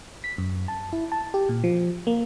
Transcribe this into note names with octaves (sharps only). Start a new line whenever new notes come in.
B6
F#2
A5
E4
A5
G4
A#2
F3
A#3